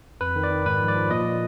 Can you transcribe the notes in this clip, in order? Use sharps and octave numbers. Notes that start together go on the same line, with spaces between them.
F2 B4
D#3
D5
D#3
G#2 B4
F3
D5
F3
A#2 D#5
F3